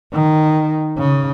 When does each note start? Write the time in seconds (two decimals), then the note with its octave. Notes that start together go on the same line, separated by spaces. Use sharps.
0.13 D#3
0.98 C#3